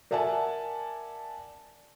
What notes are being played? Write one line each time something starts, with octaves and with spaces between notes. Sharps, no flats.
A#4 D5 E5 F#5 G#5 A5